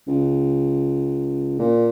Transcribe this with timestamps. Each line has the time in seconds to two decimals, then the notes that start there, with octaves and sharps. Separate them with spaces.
0.08 C#2
1.59 A#2